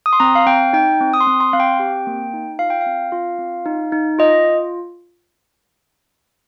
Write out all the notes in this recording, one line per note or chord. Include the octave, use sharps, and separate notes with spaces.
D#6
C6
C4 A#5
F5
C4 G5
D#4 G5
C4
D#6
C6
C4
C6
C4 F5
G5
G4
A#3
D#4
F4 F5
G5
F5
C4
F4
C4
D#4
D#4
F4 D#5